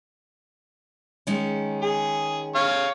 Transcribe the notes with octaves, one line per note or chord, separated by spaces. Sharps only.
D#3 G#3 C#4
G#4
C#5 F5